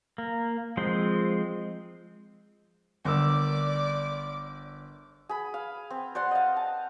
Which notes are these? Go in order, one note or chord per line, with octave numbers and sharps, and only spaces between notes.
A#3
F3 G#3 C4 C5
G1 A#4 D5 D6 E6
G#4 B5
F5
C4
C5 D5 F#5 C6
D#5 F5
A5